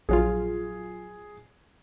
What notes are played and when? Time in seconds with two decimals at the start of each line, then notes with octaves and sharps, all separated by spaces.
0.09 A#1 F#3 F4 G#4